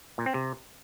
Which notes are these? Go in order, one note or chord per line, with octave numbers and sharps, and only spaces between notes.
A#2
C4
C3